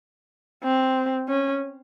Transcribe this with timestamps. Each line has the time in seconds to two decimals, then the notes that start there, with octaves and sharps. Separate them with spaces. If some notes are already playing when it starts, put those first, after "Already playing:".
0.64 C4
1.29 C#4